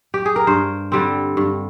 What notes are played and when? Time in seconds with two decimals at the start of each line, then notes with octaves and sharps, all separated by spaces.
0.14 G4
0.26 G#4
0.36 A#4
0.47 G2 C5
0.92 D3 G3 C4
1.37 G2